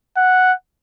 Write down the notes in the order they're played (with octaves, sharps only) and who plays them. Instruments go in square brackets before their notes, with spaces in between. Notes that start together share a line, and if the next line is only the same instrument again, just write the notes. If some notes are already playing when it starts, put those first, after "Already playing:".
[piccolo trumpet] F#5